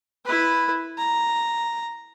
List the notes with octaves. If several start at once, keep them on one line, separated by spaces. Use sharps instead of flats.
E4 B4
A#5